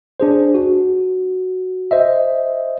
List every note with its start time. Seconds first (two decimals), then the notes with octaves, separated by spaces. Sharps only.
0.20 D4 G#4 C5
0.54 F#4
1.91 C5 D#5 E5